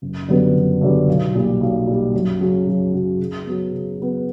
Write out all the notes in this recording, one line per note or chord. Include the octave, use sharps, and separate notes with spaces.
F#1
F#2 D3 G3 B3
F#1
F#2 D3 G3 B3
B1
A#2 G3
B1
A#2 G3
F#2
C#3 F#3 C#4 F#4
F#2
C#3 F#3 C#4 F#4
C#3
F#3 B3
C#3
F#3 B3